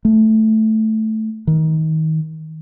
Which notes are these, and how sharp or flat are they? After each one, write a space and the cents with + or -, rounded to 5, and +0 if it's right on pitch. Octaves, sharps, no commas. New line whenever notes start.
A3 -5
D#3 +25